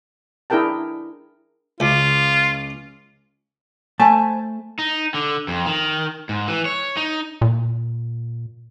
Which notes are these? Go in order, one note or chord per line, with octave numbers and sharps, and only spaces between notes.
D4 E4 G#4 A#4 G5 A5
C#2 F4
A3 C5 G#5 A5 B5
D#4
D3
F2
D#3
G#2
E3
C#5
D#4
A#2